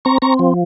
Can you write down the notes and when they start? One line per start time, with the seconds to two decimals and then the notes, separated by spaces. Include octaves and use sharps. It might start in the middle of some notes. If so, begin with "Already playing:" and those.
0.05 C4 A#5 C#6
0.22 C4 A#5 C#6
0.39 F3